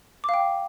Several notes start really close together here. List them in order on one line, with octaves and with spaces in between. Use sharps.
D6 F5 G5